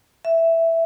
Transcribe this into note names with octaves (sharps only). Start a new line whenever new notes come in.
E5